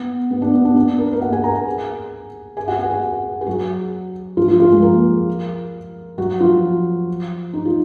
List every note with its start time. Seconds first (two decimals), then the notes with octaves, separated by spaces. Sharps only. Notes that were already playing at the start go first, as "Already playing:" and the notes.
Already playing: B3
0.31 B3
0.42 D4
0.53 B3
0.65 D4
0.76 D4
0.98 A#4
1.06 B4
1.13 A#3 A#4
1.21 F#4 F#5
1.32 G#4 G#5
1.44 A#4 A#5
1.55 G#4 G#5
2.57 G#4 G#5
2.68 F#4 F#5
2.79 G#4 G#5
2.91 F#4 F#5
3.41 G#4
3.47 F#3 F#4
4.37 F3 F4
4.48 F3 F4
4.60 F3 F4
4.71 G#3 G#4
4.82 A#3 A#4
6.18 F#3 F#4
6.40 F3 F4
7.53 D#4
7.65 F4